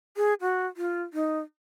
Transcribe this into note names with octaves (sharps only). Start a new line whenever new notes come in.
G#4
F#4
F4
D#4